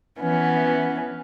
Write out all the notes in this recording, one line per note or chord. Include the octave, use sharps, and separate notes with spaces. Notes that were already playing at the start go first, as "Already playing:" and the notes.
E3 B3 C#4